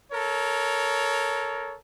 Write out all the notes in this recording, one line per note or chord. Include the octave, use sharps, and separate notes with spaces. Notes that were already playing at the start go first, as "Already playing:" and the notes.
A4 A#4 C#5